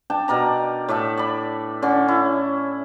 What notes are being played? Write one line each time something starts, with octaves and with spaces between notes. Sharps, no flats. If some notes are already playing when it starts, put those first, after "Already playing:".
D4 G5 A5
B2 A#4 D5 A#5
A2 D5 E5 A5
D5 B5
D3 C#4 D6
E4